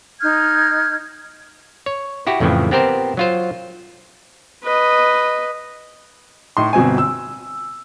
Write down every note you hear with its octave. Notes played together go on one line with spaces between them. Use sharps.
D#4 F6 G6 G#6
C#5
E4 F#4 G4
F2 A2 C#3 E3 F3
B3 C4 G4 A#4 C5
F#3 F4 C5
B4 D#5
A2 D#4 C6
G1 B2 C4 G#5
E6